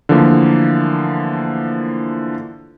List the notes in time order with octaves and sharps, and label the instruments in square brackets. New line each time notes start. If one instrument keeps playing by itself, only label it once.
[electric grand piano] D3 E3 F3 A3 A#3